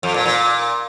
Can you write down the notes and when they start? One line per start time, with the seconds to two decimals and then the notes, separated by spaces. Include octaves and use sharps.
0.03 F2
0.14 A#2
0.26 A#2